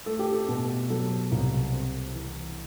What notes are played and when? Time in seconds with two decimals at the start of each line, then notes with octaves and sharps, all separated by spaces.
0.06 A3 A4
0.19 G4
0.32 A4
0.49 B2
0.90 F#3 A4
1.32 C2
1.73 C4
2.14 E3